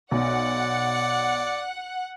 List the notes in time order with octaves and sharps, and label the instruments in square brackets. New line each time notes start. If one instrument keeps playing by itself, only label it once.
[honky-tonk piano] B1 [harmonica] D5 [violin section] F#5